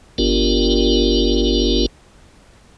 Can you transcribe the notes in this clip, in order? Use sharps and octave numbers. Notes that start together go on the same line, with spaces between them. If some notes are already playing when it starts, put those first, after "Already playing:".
G1 B3 D4 F4 G4 A#4